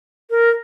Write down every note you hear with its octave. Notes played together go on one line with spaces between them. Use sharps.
A#4